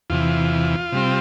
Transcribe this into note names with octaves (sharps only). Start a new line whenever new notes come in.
E2 C3 E3 F4
C3 G3 C4